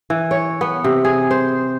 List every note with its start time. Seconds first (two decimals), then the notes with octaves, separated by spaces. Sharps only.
0.10 E3
0.31 C#5
0.61 B3
0.84 C3
1.05 G#4
1.31 C5